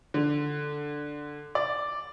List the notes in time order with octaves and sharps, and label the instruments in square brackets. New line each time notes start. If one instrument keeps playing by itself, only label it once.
[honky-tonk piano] D3
D5